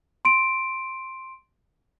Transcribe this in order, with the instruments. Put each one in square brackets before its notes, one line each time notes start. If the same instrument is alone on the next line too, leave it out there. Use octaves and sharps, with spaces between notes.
[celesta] C6 D7